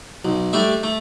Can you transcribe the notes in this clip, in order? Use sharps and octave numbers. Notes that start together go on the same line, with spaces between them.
B1
G3 A3 D4 E5
A3